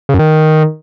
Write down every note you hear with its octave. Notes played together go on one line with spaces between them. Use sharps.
C#3
F#2
D#3